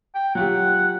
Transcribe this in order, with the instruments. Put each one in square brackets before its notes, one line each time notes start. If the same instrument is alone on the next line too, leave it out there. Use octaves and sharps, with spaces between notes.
[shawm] G5
[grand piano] F#3 F4 G4 [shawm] F#5